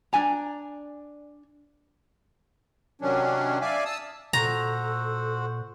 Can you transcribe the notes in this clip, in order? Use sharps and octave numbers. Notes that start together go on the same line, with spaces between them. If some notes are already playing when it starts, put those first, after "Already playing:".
D4 D5 G#5 A#5
C3 D#3 F#3 C#4 D4
D5 E5 F5 G#5
A5 D#6 E6
A#2 F#4 A4 C5 F#5 A#5